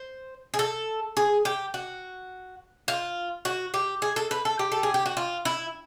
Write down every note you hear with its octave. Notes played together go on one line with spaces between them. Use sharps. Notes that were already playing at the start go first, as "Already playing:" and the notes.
Already playing: C5
G#4
A4
G#4
G4
F#4
F4
F#4
G4
G#4
A4
B4
A4
G4
A4
G#4
G4
F#4
F4
E4